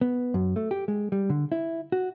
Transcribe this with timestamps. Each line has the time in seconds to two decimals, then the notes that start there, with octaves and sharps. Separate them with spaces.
0.01 B3
0.34 F#2
0.56 A3
0.71 G4
0.88 G#3
1.12 G3
1.30 D3
1.52 E4
1.92 F#4